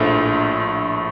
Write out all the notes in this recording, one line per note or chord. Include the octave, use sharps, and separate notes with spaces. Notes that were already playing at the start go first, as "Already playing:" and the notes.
Already playing: A#1 A2 A3 D4 F4